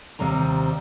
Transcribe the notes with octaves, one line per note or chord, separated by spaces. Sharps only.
D#2 C3 G3 C5 A#5